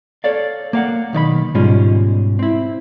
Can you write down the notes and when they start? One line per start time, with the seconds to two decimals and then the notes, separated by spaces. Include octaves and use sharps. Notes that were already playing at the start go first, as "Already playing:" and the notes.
0.24 A4 C#5 D5 F5
0.73 A#3 F5 F#5
1.13 B1 D#3 D5 B5
1.55 G#2 B2 G3 G#3 C#4 F4
2.39 C4 E4